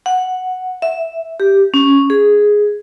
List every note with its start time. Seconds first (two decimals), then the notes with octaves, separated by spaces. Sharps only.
0.06 F#5
0.82 E5
1.40 G4
1.74 C#4
2.10 G#4